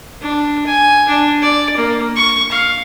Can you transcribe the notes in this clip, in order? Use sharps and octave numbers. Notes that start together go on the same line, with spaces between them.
D4
G#5
D4
D5
A#3
C#6
F5